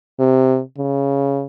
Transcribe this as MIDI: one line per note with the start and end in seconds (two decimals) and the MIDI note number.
0.19 0.61 48
0.78 1.47 49